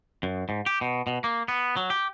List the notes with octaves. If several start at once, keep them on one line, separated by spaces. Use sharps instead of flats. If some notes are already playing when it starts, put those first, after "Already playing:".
F#2
G#2
G4
B2
B2
A#3
B3
F#3
G4